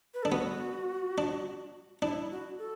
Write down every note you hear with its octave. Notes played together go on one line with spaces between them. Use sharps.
B4
D4 A4
B3 F#4
D4
D4 E4
F#4
A4